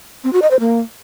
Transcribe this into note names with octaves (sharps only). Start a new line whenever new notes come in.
C4
F#4
D#5
C5
A#3